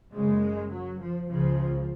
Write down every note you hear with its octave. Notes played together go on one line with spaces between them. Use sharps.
F#1 F#2 C#3 G#3
F#3
F3
C#2 C#3 F3